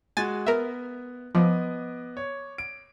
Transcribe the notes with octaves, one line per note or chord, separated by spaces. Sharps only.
G#3 F#4 G#5 A6
B3 A#4 E5
F3 B3 D#5 D6
C#5
D7